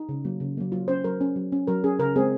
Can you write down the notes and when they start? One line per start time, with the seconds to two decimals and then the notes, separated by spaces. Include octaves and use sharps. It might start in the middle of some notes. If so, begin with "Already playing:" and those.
Already playing: D#4
0.09 C#3
0.25 F#3 A#3
0.40 C#3
0.57 F#3 A#3
0.72 F#3 F4
0.88 C#4 C5
1.04 F#3 A#4
1.21 C#4
1.36 F#3
1.52 C#4
1.67 F#3 A#4
1.84 C#4 G#4
1.99 C#3 A#4
2.16 G#3 C4 G#4